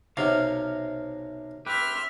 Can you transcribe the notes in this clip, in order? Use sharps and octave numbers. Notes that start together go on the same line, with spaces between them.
B1 C3 A#4 F5
G4 B4 E5 C6 F6